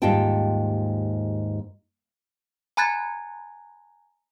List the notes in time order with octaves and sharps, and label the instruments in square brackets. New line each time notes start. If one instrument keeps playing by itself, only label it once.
[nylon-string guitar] D#2 G#2 G3 F4 G5 A5
[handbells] G#5 A#5 B5 F#6 G#6 A6